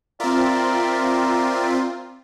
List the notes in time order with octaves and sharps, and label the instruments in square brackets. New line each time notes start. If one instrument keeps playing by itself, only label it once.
[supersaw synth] C4 F4 [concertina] A#4 D5 E5